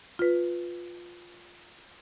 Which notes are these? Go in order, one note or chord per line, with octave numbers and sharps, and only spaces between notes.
F4 B4